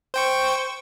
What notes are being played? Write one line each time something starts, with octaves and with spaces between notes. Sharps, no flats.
C5 G5 C#6